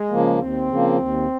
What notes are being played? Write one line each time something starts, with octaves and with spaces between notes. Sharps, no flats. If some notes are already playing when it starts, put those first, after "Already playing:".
Already playing: G#3
C#3 F3 A#3
D#2 C4
C#3 F3 A#3
D#2